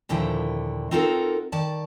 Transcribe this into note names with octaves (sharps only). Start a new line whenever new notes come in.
D#2 A#2 D3 F3 E4 G5
C4 D#4 F4 F#4 A4 A#4
D#3 D5 A5